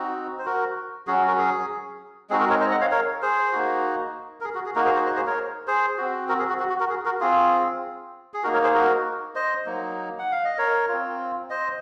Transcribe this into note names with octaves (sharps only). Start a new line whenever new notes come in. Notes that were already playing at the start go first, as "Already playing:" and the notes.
Already playing: C4 D#4 F#4
C5
F#4 A#4
F#3 C#4 F#4 G#4
F#4 A#4
G#4
G#3 C4 D#4 F#4 G#4
F#4 A#4
A#4 C#5
C5 D#5
D#5 F#5
C#5 F5
A#4 C#5
G#4 C5
A#3 D#4 F#4
A#4
G#4
F#4
G#4
A#3 D#4 F#4 A#4
G#4 C5
G#4 C5
C5 D#5
G#4 C5
A#4 C#5
G#4 C5
C4 F#4
F#4 A#4
G#4
F#4
F#4
F#4
F#4 A#4
G#4
F#4 A#4
C4 F4 G#4
G#4
A#3 D#4 F#4 A#4
A#4 C#5
G#4 C5
F#4 A#4
C5 D#5
F#3 A#3 D#4
F#5
F5
D#5
A#4 C#5
C4 F4
C5 D#5